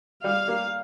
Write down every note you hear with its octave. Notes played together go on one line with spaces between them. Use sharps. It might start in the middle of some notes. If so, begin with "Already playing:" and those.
G3 F5
A#3